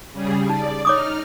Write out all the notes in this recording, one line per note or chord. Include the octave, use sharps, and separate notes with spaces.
C#3 G3 G#4
D#4 D5
D#4 C#5 D6 D#6 F6